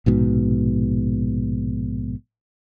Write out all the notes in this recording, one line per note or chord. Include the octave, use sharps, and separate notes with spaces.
A#1 G#2 B2